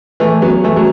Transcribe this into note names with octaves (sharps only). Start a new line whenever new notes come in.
E3 A3
F#3 B3
E3 A3
F#3